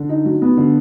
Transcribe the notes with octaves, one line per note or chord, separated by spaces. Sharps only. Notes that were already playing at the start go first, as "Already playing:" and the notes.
Already playing: D3
D#4
F#3
B3
D3